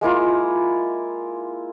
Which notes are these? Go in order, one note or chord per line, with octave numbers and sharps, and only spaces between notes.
G#3 A#3 E4 F4